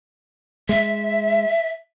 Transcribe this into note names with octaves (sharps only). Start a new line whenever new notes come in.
G#3 E5